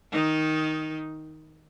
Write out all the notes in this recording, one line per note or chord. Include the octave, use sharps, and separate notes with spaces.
D#3 D#4